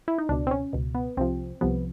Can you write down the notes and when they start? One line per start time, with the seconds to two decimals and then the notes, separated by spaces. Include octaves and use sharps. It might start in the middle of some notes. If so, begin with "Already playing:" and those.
0.08 E4
0.18 D#4
0.29 C#2 B2 D4
0.47 C4
0.51 C#4
0.73 C#2 B2
0.95 B3
1.17 C2 C3 F3 C4
1.61 C2 C3 F3 B3